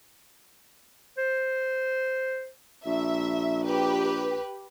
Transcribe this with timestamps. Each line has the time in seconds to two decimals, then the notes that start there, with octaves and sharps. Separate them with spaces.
1.18 C5
2.86 A#1 E5
3.66 G4 B4